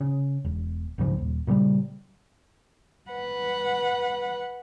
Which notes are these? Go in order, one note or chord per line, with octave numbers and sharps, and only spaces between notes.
C#3
E1
B1 G#2 C#3 F3
D#1
A#2 C#3 F3 G3
B4 F#5